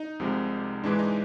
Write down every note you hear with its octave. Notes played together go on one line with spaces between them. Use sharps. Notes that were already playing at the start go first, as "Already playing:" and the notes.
Already playing: D#4
C2 C3 F3 G#3
G#2 E3 G#3 D4
D#4